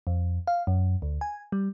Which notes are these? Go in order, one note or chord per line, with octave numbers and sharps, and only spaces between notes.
F2
F5
F#2
D2
G#5
G3